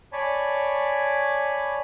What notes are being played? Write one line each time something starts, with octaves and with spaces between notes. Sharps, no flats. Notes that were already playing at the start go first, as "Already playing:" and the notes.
C#5 D5 G#5 A5 B5